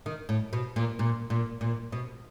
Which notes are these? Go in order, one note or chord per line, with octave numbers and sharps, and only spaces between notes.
D#3
A2
B2
A#2
A#2
A#2
A#2
B2